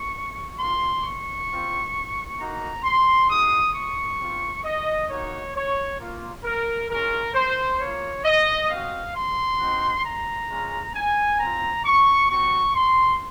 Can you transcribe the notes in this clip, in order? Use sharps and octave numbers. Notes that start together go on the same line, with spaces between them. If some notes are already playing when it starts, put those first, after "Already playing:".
Already playing: C#6
A#3 F4 C6
C#6
C4 F4
A#3 D#4 F#4 A#5
C6
G#3 D#4 F#4 D#6
C#6
C4 F4
D#5
A#3 D#4 F#4 C#5
C#5
A#3 F4
A#4
G#3 C#4 F4 A#4
C5
A#3 F4 C#5
D#5
C4 F#4 F5
C6
C4 D#4 F#4
A#5
G#3 C#4 F4
G#5
C4 F4 A#5
C#6
C4 F#4 C#6
C6